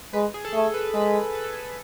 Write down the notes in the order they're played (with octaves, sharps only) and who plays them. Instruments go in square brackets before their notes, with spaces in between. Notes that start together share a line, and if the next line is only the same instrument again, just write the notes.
[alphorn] G#3 [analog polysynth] B4
[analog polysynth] G#4
A4
[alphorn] A3 [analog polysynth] G#4
[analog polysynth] B4
[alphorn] G#3 [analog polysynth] B4
[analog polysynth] B4
A4
G#4
A4